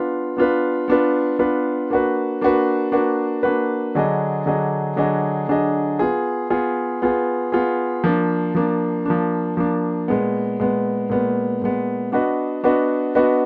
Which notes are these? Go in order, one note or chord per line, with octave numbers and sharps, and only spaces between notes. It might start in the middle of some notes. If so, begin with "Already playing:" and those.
Already playing: B3 D4 F4 B4
B3 D4 F4 B4
B3 D4 F4 B4
B3 D4 F4 B4
A#3 D4 F#4 B4
A#3 D4 F#4 B4
A#3 D4 F#4 B4
A#3 D4 F#4 B4
D3 F#3 D4 G#4 D#5
D3 F#3 D4 G#4 D#5
D3 F#3 D4 G#4 D#5
D3 F#3 D4 G#4 D#5
B3 F4 G#4
B3 F4 G#4
B3 F4 G#4
B3 F4 G#4
F3 A#3 D4
F3 A#3 D4
F3 A#3 D4
F3 A#3 D4
A#2 G#3 B3
A#2 G#3 B3
A#2 G#3 B3
A#2 G#3 B3
B3 D4 F#4 B4 D#5
B3 D4 F#4 B4 D#5
B3 D4 F#4 B4 D#5